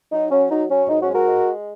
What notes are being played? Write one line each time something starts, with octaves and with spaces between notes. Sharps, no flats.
F#3 D#4
F#3 C#4
F#3 D#4
F#3 C#4
G#2 D#4
C#4 F#4
G#3
F#4 A#4
G#3